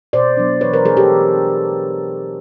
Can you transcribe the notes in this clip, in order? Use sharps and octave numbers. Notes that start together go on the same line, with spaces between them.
B2 C5 D5
F#3 B3 D4
E3 B4 C#5
A#4 C5
A3 D4 G#4 A#4
G4 A4
E3
A3 D4